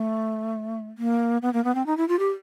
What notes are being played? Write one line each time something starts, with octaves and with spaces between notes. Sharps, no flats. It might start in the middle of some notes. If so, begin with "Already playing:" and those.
Already playing: A3
A#3
B3
A#3
B3
C4
D#4
E4
F4
G4